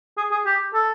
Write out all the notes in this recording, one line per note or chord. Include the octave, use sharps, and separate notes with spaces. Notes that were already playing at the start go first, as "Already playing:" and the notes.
G#4
G#4
G4
A4